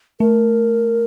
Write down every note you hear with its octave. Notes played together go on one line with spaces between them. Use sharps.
A3 A#4